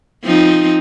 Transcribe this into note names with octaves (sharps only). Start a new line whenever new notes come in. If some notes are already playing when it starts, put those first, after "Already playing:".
F3 C4 D#4